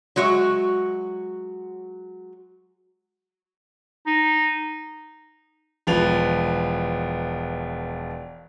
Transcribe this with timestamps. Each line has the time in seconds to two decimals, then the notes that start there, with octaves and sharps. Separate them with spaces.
0.16 F#3 G#3 F#4 C#5 E5
4.07 D#4
5.87 E1 F3 B4 F7